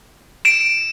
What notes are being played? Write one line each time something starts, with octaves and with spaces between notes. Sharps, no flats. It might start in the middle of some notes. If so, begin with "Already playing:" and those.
D7 E7